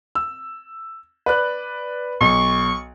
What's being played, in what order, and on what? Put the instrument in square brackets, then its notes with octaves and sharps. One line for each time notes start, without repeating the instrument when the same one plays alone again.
[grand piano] E6
B4 D5 F#6
[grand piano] B1 [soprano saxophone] C#6